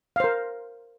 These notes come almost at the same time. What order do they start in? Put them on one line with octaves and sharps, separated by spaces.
F5 C5 A#4